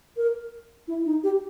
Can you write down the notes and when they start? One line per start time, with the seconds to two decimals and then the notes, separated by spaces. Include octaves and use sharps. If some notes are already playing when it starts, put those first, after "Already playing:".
0.17 A#4
0.88 E4
1.06 D#4
1.23 G4